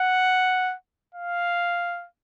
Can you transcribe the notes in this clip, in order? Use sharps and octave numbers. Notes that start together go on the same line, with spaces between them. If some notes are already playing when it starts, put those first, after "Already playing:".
Already playing: F#5
F5